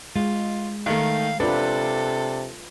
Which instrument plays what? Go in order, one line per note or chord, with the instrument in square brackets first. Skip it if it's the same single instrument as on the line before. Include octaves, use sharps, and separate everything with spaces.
[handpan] G#3 [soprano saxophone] F4
[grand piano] D#3 A3 [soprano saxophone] F5
[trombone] C3 [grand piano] D4 [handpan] F4 B4 [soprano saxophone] A4